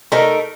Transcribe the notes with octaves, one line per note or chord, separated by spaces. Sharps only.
A3 D#4 A#4